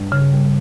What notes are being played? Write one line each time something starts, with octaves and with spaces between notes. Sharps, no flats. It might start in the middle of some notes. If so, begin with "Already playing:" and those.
Already playing: G2 G3
C#3
G3